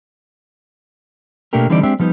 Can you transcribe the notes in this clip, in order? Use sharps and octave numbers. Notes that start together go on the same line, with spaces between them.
B2 A3 A#3 D4 G4 A#4
D3 E3 G3 C4 D#4 D5
G#3 C4 D4 G4 E5
F3 G3 B3 D#4